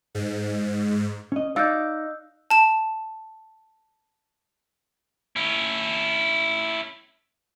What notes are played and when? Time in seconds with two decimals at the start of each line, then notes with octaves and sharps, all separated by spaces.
0.15 G#2
1.32 C#4 D#5
1.56 D#4 D5 F5 E6 F#6 G6
2.50 A5 E7
5.36 C#4 E4